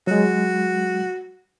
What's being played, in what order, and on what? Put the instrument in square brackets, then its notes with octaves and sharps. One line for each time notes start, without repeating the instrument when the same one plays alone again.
[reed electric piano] F#3 G#3 [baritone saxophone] F#4